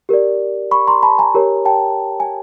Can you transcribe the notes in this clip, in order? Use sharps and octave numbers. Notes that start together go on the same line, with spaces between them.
G4 A#4 D5
B5 C#6
A#5 C6
A5 B5
G#5 A#5
G4 A#4 C#5
G5 A5
G#5